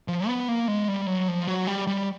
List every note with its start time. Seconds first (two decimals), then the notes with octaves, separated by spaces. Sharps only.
0.08 F3
0.27 B3
0.48 A#3
0.68 G#3
0.88 G3
1.07 F#3
1.28 F3
1.47 F#3
1.67 G3
1.87 G3